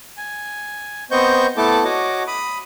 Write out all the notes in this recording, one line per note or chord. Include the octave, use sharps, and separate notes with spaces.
G#5
B3 C4 C5 D#5 C#6 G6
A3 B3 E4 A4 A5 D6
F#4 C#5 D#5 D6
B5 D#6